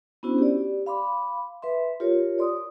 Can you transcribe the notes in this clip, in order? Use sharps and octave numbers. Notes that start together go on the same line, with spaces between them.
B3 C#4 D4 E4 F#4 C5
G4 D5
F5 B5 C6 D6
B4 E5 C6
F4 G4 A#4 C#5
D5 C6 D#6